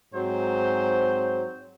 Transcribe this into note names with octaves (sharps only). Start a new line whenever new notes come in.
G#2 F#3 C4 C5